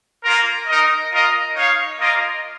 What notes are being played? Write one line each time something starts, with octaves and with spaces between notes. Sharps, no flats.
A#3 F4 A#4
D#4 A#4 D#5
F4 A#4 D#5
D#4 C#5 F5
A#3 F4 A#4 D#5